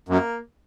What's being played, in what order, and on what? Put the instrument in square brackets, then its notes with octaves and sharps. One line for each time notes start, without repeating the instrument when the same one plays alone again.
[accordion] F#2 [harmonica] A#3